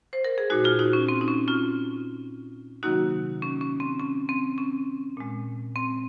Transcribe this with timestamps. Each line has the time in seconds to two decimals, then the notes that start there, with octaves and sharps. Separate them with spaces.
0.13 C5
0.25 A#4
0.38 G#4
0.50 A#2 G#3 D#4 F#4
0.65 F4 G#4
0.79 D#4 F#4
0.93 C#4
1.09 C4
1.21 D#4
1.28 C#4
1.48 C#4 F4
2.83 C3 D#3 F#3 A#3 D#4 F#4
3.42 C#4
3.61 C#4
3.80 C4
3.99 C#4
4.29 C4
4.58 C#4
5.17 A#2 G#3
5.76 C4